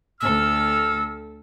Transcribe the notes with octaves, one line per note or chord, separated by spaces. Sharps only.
D2 A4 E6 F6